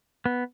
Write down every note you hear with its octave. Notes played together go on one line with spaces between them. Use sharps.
B3